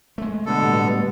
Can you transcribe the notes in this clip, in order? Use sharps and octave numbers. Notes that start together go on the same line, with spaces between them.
G#3 A3
B2 D3 A4
A2 G3 B3